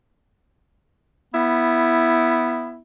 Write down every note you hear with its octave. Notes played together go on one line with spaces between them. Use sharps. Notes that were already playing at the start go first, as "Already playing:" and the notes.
B3 E4